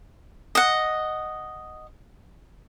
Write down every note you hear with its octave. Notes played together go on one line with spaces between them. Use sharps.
D#5 F#5